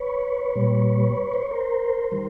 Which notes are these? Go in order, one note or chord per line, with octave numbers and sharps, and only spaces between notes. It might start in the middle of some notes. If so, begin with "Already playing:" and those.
Already playing: B4 C#5
A#2 G3
C5
C#5
A#4 C5
D#3 G3